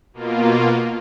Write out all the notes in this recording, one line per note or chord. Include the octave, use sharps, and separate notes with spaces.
B2 A#3 F4